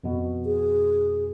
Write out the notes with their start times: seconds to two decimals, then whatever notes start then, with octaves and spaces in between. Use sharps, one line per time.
0.04 F2 B2
0.46 G#4